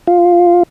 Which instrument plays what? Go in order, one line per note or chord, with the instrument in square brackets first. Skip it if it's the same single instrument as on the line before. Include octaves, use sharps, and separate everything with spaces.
[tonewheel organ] F4